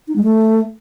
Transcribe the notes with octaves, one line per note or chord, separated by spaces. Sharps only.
D#4
G#3
A3